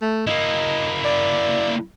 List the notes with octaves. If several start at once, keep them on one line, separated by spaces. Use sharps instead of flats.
A3
A#3 E4 D#5
D5